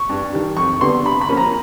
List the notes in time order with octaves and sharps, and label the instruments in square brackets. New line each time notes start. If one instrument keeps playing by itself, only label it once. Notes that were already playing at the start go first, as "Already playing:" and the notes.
Already playing: [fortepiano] C#6
G2
D#3 G3
F2 C#6
D3 G3 B3 C6
C3 B5
B5
F3 A#3 C#4
A#5